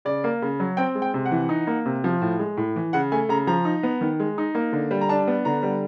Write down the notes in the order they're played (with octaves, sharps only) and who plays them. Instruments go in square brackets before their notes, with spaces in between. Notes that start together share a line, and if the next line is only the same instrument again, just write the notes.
[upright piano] C#3 D5
A#3
C#3
F#3
C4 G5
G#3
G5
C3
F#5
E3
D#4
A#3
C3
F3
A2
G#3
A2
E3
C#3 F#5
A3 G#5
C#3 A#5
F3 A#5
D#4
B3
D#3
G#3
D#4
A#3
D3
G3
A#5
D4 A5
B3
D3 A#5
G3